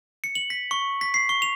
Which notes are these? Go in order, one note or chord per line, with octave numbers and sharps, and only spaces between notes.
C#7
F#7
B6
C#6
B6
C7
C#6
F7